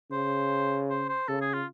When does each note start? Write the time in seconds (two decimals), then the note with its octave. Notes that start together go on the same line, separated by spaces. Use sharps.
0.11 C#3 C5
0.90 C5
1.09 C5
1.28 C#3 A4
1.41 G#4
1.54 F4